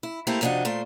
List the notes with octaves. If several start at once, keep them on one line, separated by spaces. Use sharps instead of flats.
E4
A3 A#3 C4 E4 G4 A#4
F2 C3 C4 D4 F#4 D#5
A#2 A3 C5